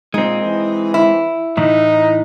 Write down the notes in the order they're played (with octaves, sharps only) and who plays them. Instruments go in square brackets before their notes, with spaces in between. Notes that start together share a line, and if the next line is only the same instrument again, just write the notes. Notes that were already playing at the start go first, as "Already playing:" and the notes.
[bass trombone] A#2 [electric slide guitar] G#3 C4 [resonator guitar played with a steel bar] D#4
[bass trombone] E3
[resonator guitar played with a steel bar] E4
[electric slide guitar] A2 E3 [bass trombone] D#4